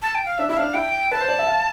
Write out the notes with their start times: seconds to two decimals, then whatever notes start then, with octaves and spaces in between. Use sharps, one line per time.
0.02 A5
0.15 G5
0.26 F5
0.38 D4 E5
0.49 E4 E5
0.57 D4 F5
0.74 E4 G5
1.11 B4 A5
1.20 C5
1.28 D5
1.39 E5
1.47 F5